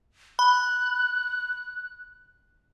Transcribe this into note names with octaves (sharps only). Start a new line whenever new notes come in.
B5 F#6